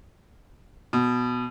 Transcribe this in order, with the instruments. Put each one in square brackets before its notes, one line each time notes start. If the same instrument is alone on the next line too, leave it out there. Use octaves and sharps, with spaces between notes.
[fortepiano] B2